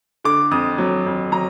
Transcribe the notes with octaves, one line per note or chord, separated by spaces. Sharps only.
D3 D6
F2 D#6
F#3
F2
F#3 A#5